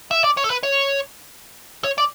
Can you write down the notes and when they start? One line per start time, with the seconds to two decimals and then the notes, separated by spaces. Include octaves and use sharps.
0.11 E5
0.24 D5
0.37 C#5
0.44 A4
0.50 B4
0.63 C#5
1.84 C#5
1.98 D5